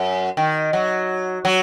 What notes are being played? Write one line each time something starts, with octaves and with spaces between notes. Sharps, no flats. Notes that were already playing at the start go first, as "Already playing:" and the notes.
Already playing: F#2
D#3
F#3
F#3